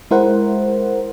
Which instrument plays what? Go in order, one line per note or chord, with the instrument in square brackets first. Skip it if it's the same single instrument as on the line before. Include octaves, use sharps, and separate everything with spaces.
[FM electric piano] G#3 E4 A#4 C5 F#5